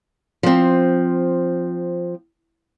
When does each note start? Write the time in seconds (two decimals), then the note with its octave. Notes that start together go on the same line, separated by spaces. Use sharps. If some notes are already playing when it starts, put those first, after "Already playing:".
0.43 F3 C4